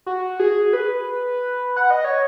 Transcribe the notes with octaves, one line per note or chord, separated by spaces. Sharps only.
F#4
G#4
B4
F#5
D#5
C#5